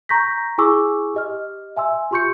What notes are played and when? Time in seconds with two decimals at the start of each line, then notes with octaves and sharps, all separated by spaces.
0.09 A#5 C#6 G6 A#6 B6
0.58 E4 G#4 G#5 C#6 D6 E6
1.14 G4 D#5 F6
1.76 E5 G#5 C6 E6
2.11 F4 G4 C6 C#6 G6 C#7